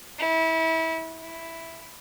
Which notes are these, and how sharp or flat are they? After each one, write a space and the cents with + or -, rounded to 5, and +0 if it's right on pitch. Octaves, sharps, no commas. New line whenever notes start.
E4 -25
E4 +0